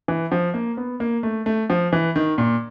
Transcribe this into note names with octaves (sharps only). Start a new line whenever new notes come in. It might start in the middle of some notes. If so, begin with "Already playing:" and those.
E3
F3
A#3
B3
A#3
A3
A3
F3
E3
D#3
A#2